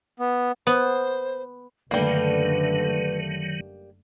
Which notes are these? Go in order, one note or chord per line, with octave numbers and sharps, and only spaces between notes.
B3
B3 C5
F#1 D3 D#3 F#3 G3 A3 A#3 B4